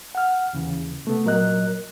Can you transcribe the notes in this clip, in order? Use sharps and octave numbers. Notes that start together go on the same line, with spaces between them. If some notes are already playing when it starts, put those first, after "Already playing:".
F#5 F6
D#2 C#3 E3
C3 A3 B3
A#2 F#3 A#4 D#5 F#6